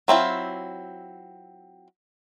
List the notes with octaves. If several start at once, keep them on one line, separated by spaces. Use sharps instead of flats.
F#3 C4 E4 F4